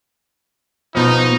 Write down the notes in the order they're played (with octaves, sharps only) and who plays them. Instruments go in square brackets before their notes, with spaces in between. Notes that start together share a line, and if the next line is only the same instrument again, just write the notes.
[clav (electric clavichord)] B2 F3 [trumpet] D#4